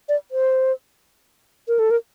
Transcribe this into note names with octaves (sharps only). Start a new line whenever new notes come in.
D5
C5
A#4
A4
A#4